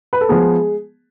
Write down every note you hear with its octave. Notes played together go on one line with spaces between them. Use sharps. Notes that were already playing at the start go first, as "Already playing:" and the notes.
B4
A4
F3 G#3 B3 G#4